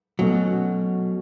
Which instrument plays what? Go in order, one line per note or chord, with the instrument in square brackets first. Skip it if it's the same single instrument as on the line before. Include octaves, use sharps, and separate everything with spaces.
[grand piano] B2 A3 C#4 [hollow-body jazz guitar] F#3